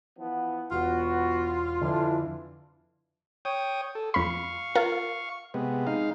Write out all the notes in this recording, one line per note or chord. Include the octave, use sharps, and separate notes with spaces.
E3 F3 B3
E1 B3 F4 F#4
F2 D3 E3 D4 E4
C#5 G5 D#6
A4
F2 F5 B5 C#6
F4 A#4
C3 G#3 B3
G#3 D#4 F5